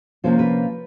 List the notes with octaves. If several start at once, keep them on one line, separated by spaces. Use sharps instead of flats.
C3 F3 A#3 C#4 F4 C5
B4